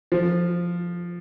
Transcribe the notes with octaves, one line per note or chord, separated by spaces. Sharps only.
F3